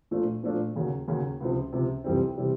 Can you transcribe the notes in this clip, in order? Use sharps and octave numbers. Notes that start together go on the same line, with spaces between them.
A#2 F3 A3 D4 F4
A#2 F3 A3 D4 F4
D#2 C#3 F#3
D#2 C#3 F#3
C#2 C3 F3
C#2 C3 F3
F2 C3 E3 G3 C4
C3 E3 G3 C4